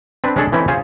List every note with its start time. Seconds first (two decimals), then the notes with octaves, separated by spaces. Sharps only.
0.24 C4 D4 B4
0.36 G#3 C#4 D4 G#4 A4 D5
0.52 E3 A3 C4 C#4 D#4 E4
0.68 C#4 F4 G#4 C5